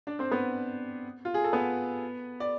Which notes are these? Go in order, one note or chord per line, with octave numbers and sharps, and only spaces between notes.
D4 D5
C4 C5
B3 B4
F4
G#4
A4
B3 B4
D5